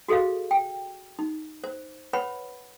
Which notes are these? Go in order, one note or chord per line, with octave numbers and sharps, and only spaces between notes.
F#4 G#4 A4 D#5 F5
G5
D#4
C5
B4 C#5 F#5 B5